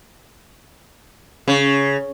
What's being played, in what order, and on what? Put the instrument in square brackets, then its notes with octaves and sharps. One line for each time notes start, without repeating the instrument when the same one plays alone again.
[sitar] C#3